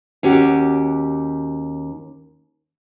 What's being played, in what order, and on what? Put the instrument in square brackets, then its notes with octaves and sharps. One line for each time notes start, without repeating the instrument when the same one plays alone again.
[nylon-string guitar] D#2 C#4 F#4 G4